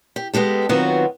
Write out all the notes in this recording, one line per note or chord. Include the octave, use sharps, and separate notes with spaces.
G4
G#3 B3 G4 A4
D#3 F#3 B3 C4 F4 F#4